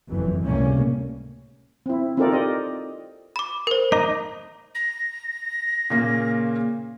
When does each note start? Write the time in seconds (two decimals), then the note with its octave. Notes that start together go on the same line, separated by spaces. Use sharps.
0.10 F#1 F2 E3
0.42 C#2 A2 C3 G3 A#3 C#4
1.86 C4 E4
2.17 C4 D#4 F4 A4 A#4 D5
2.32 G4 D5 D#5
3.36 B5 D6
3.67 A#4 C5
3.92 D#4 D#5 A#5 D6
4.75 A#6
5.90 A#2 C#3 A#3